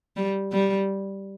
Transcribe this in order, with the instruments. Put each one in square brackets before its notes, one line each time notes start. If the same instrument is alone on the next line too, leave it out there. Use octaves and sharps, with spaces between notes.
[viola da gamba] G3
G3